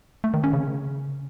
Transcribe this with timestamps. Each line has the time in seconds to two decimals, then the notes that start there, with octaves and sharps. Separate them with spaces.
0.24 A3
0.34 D#3
0.44 C#4
0.53 C#3